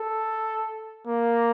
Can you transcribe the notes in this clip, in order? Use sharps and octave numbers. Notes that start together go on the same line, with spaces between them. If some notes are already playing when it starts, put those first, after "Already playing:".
Already playing: A4
A#3